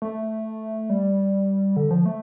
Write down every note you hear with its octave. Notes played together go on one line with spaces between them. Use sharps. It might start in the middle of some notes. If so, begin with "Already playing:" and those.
A3
G3
D3
F3
A3